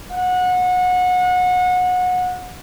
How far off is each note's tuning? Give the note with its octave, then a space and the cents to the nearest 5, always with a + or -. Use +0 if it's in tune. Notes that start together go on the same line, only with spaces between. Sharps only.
F#5 -25